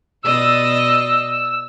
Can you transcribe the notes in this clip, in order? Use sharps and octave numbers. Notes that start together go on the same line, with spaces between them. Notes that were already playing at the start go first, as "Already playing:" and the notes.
B2 D5 D#5 E6